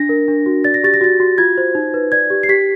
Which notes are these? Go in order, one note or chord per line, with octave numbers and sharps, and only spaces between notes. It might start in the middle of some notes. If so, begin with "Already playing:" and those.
Already playing: D4 A#6
A#4
D4
F#4
D5 A6
A#6
G4 A6
A#6
F#4 A6
F#4
F4 G#6
C5
D#4
B4
D5 G#6
G4
C7
G4 B6